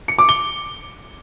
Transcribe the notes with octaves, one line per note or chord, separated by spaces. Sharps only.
C#7
D6
G7